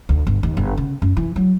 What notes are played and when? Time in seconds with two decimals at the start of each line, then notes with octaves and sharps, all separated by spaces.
0.09 D2
0.27 G1
0.43 D#2
0.57 G1
0.77 C#3
1.02 F#2
1.17 E3
1.36 F#3